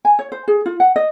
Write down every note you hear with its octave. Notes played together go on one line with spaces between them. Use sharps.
G#5
C#5
C5
G#4
F4
F#5
D#5